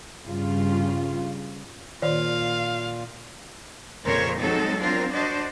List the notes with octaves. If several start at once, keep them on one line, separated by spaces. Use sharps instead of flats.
G2 C#3 G3 F4
A#2 D#3 F4 C#5 D5 F5
F2 A#2 C#3 A#4 C5 C#5
F3 F#3 G#3 C4 D#4 A4
C4 D4 F4 A#4
D4 F#4 C5 D5 D#5